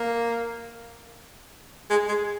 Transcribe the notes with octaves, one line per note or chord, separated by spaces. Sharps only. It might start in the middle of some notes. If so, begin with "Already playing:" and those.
Already playing: A#3
G#3
G#3